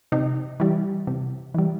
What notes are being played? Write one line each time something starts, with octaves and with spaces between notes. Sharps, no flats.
C3 D#4
E3 G3
C3
E3 G3